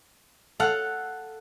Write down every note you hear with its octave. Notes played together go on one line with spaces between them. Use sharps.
A4 F5 F#5